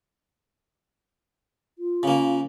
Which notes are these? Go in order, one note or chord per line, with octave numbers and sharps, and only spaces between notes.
F4
C#3 A#3